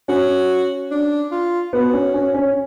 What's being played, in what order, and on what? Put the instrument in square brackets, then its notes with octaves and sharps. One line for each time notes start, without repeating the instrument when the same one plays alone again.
[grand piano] C#4 [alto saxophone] F#4
[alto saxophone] D4
F4
[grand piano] B3 [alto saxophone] F#4
[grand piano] C#4
C#4
C#4